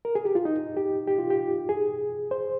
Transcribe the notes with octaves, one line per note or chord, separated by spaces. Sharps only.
A#4
G#4
G4
F4
D#4
G4
G4
F4
G4
G#4
C5